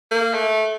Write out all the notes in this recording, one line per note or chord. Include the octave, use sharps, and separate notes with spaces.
A#3
A3